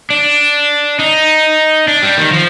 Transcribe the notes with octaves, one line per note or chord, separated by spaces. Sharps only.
D4
D#4
D4
G3
D#3
F3